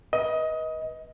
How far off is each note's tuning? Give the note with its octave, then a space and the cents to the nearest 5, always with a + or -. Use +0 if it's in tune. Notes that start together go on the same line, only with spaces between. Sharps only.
B4 -25 D#5 +20